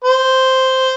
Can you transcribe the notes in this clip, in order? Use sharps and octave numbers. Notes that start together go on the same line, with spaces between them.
C5